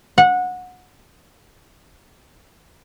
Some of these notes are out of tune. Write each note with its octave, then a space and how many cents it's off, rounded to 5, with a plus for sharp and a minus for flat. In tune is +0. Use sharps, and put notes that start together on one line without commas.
F#5 -20